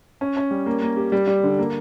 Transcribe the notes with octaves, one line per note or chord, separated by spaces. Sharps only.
C#4
C#4
G3
A#3
A#3
G4
G3
G3
D3
A#3